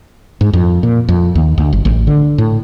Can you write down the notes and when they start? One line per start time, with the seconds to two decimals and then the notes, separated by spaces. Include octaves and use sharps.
0.41 G#2
0.53 F2
0.83 A#2
1.09 F2
1.35 D#2
1.58 D2
1.73 G1
1.85 A1
2.07 D3
2.38 A2